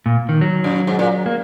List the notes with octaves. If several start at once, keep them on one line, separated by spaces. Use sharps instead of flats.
A#2
D#3
F#3
F#2
G#2
A#2
A#3